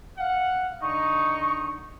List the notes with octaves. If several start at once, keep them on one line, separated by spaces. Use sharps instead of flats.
F5 F#5
D3 D#4 C#6